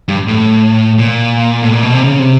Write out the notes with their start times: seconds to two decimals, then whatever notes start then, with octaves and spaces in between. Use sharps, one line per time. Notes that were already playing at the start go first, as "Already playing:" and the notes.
0.08 G2
0.28 A2
0.99 A#2
1.63 A2
1.73 A#2
1.83 B2
1.94 C3
2.03 C#3
2.19 C3